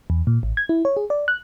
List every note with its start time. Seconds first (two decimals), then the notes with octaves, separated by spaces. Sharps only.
0.10 E2
0.27 A#2
0.43 A1
0.57 G#6
0.69 E4
0.85 C#5
0.97 G#4
1.10 D5
1.28 F#6